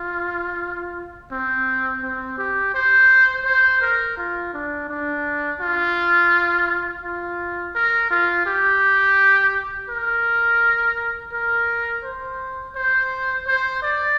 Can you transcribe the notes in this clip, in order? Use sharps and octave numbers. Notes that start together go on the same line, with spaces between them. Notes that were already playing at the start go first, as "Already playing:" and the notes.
Already playing: F4
C4
C4
G4
C5
C5
A#4
F4
D4
D4
F4
F4
A#4
F4
G4
A#4
A#4
C5
C5
C5
D5